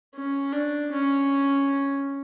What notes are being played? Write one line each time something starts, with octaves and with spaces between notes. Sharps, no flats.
C#4
D4
C#4